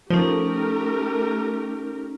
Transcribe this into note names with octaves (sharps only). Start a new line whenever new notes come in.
F3 A3 C#4 D#4 G4 A#4